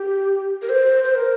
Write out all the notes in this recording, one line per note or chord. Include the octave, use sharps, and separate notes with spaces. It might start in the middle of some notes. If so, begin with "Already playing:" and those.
Already playing: G4
A#4
C5
C5
A#4